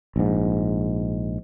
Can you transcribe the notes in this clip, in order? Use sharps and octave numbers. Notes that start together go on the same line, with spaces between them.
A#1 G#2